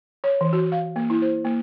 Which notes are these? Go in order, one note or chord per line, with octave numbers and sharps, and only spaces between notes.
C#5
E3
F#4
F5
A#3
E4
C5
A#3